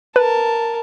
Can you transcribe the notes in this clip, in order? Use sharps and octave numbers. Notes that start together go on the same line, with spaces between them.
A#4 B4 A5